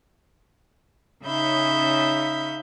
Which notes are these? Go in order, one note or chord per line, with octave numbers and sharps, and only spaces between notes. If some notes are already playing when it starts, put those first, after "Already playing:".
C#3 C#4 D#4 E5 B5 G6